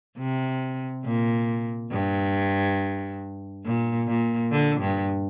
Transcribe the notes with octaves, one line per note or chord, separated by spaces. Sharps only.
C3
A#2
G2
A#2
A#2
D3
G2